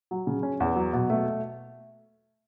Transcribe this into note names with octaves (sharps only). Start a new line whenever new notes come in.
F#3
C#3
C#4
E2
F#3
B2
A3